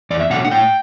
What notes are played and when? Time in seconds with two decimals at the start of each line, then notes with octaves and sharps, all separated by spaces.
0.10 E2 D5
0.20 E5
0.30 B2 F#3 A3 D4 F#5
0.45 F#5
0.51 A2 G5